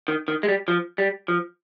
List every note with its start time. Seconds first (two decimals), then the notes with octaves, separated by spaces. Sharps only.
0.08 D#3
0.28 D#3
0.43 G#3
0.48 G3
0.68 F3
0.98 G3
1.28 F3